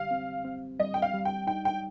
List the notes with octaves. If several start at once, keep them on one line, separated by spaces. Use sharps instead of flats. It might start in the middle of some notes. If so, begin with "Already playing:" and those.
Already playing: D3 G3 G4 F5
C4
C4
G3 D#5
G5
F5
G3
G5
D#4 G5
G5